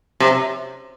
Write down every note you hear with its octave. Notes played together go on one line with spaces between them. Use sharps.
C3